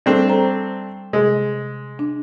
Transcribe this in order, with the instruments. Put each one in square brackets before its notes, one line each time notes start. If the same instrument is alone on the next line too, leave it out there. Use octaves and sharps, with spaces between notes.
[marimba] G3 [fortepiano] A3 C4 D4
[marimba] A4 C5 A#5
[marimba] C3 [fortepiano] G#3
[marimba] D4